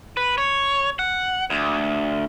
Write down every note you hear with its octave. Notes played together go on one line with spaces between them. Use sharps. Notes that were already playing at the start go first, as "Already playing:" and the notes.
B4
C#5
F#5
D2